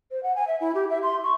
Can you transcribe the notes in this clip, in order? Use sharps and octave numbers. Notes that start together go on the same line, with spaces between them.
C5
F#5
G#5
E5
E4
G4
E5
C6
C#6